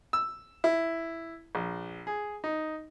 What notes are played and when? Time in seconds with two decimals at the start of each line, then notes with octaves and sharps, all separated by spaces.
0.13 E6
0.64 E4
1.55 A#1
2.07 G#4
2.44 D#4